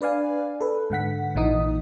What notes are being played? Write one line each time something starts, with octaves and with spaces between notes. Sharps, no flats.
D4 B4 D5 F5 G#5
A4 B4
G#2 D3 F#5 B6
A#1 A#2 E3 D#4 D#6